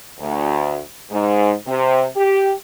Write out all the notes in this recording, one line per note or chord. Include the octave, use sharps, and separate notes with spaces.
D2
G#2
C3
G4